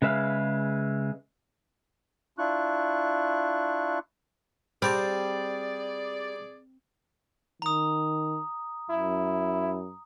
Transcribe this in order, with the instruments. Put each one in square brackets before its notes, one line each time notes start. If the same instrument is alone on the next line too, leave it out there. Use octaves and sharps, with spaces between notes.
[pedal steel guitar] C#3 G#3 B4 E5 F5
[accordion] D4 E4 F4 C#6 F#6
[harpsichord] G3 G4 A5 [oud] C4 [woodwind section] G#4 D5
[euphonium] D#3 [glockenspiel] A#5 D#6
[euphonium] F#2 [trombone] E4